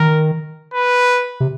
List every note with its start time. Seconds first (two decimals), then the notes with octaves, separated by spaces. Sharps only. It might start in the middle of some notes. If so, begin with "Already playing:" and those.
Already playing: D#3 A#4
0.74 B4
1.40 C3